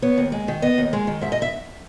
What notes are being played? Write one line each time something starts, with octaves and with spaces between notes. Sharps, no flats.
B3 C#5
D#2
G#3
D#3
B3 D#5
D#2
G#3
D#3
G#2 E5
D#5
E5